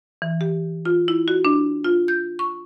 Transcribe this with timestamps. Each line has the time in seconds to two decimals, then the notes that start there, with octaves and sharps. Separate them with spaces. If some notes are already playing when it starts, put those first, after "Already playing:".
0.22 E3
0.41 G4
0.85 F4
1.08 E4
1.28 F#4
1.45 D4
1.84 F4
2.08 G6
2.39 C#6